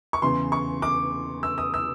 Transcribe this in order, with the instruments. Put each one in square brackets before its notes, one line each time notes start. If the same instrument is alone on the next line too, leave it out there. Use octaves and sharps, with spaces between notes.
[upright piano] C#6
E2 C#3 E3 C6
C#6
D6
E6
D#6
E6